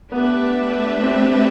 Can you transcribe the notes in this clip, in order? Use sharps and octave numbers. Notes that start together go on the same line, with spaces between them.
A3 B3 D4 G4 B4 E5
C4